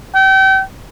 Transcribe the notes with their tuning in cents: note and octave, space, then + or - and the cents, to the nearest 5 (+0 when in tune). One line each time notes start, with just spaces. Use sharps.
G5 -35